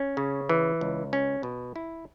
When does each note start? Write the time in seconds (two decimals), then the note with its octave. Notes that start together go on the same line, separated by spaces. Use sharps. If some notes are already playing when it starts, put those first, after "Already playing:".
Already playing: C#4
0.17 C#3
0.49 E3
0.81 C#2
1.13 C#4
1.43 B2
1.76 E4